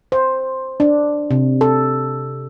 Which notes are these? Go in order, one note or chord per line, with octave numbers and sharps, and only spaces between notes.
C5
D4
C3
A4